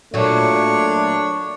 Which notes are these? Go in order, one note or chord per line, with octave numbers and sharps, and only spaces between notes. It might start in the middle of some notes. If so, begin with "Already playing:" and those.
A#2 F#3 A3 D4 C#5